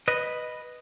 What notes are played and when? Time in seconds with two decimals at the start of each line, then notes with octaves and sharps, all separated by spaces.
0.08 B4 D#5